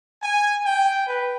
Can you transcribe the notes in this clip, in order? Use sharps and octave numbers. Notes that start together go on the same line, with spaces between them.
G#5
G5
B4